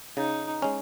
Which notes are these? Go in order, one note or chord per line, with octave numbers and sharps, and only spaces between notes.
C#3 D#4
G#3 C#4